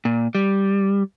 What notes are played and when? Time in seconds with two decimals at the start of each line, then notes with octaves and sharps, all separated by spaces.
0.05 A#2
0.35 G3